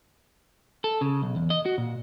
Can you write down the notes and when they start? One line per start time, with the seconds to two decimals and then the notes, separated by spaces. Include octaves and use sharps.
0.84 A4
1.01 C#3
1.22 B1
1.36 E2
1.50 D#5
1.66 F#4
1.78 A#2